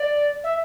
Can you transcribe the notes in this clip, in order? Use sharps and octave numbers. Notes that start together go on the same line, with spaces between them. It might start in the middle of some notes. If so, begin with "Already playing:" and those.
Already playing: D5
E5